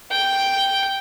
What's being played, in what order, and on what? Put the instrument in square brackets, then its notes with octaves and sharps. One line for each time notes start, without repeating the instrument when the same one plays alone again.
[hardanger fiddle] G5